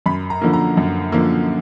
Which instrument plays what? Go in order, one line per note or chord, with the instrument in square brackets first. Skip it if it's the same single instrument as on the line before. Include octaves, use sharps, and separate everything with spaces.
[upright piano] F#2 B5
A#5
D3 F3 A#3
A#5
F#2
D3 F3 A#3